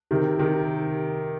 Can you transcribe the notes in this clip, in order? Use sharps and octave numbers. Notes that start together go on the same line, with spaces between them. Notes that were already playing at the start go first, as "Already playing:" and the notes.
C3 D#3
C3 D#3